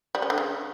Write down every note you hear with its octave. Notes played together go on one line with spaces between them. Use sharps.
G3
C#4
D3
C#3